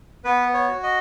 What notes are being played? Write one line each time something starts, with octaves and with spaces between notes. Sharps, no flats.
B3 B4
C#5
F#4
D#5